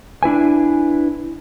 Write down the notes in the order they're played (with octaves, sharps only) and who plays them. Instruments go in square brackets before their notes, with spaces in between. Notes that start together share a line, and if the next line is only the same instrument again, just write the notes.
[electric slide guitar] D4 E4 B4 G#5